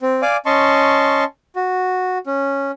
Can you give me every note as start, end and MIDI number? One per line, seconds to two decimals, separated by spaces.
0.01 0.22 60
0.22 0.37 74
0.22 0.37 77
0.22 0.37 80
0.22 0.37 86
0.46 1.24 61
0.46 1.24 75
0.46 1.24 81
0.46 1.24 84
0.46 1.24 85
1.56 2.18 66
2.27 2.71 61